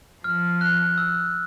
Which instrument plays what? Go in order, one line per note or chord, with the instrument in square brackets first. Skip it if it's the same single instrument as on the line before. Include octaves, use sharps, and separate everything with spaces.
[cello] F3 [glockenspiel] F6
[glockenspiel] F#6
E6